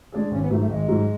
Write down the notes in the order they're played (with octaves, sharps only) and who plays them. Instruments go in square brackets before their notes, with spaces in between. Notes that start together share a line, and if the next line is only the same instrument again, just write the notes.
[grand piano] G#3 D4 G#4
[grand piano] G#1 [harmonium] C#4
[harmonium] B3
[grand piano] G#2 F#3 [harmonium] A3
[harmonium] A3
[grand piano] G#1 [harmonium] G#3
[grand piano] G#2 F#3